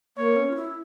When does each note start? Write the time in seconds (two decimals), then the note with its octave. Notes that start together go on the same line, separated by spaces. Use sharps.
0.17 A#3 C#5
0.36 C#4
0.51 F4
0.55 E4